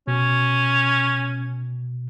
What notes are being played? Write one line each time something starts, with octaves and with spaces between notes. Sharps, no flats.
B2 C#4